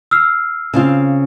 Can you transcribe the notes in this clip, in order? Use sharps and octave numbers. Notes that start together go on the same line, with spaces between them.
E6 F6 C7
C#3 C4 F4